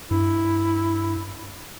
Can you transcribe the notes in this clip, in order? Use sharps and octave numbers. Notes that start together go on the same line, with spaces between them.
G2 E4